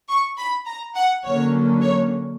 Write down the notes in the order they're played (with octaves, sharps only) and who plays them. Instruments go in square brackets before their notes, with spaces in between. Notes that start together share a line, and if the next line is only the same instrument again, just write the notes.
[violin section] C#6
B5
A#5
F#5
[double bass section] D3 F#3 A#3 C#4 [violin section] C#5
[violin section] C#5